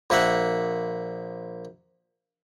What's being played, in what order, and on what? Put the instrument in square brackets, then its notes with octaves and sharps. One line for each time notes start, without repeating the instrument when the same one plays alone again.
[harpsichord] A#1 A#3 E5 F#5